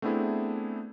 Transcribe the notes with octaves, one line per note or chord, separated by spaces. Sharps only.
A3 B3 C4 D4 E4 G#4